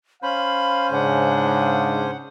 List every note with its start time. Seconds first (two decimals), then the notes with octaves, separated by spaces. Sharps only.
0.23 C#4 C5 F5 B5
0.92 G#2 C#3 D4 F#5